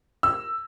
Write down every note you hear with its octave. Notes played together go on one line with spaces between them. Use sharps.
E6